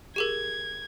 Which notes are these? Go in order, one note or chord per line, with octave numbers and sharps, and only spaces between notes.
G4 G#4 A#4 G#6